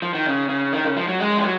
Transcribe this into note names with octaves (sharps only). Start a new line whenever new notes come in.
F3
D#3
C#3
C#3
D#3
C#3
F3
F#3
G#3
F3
F#3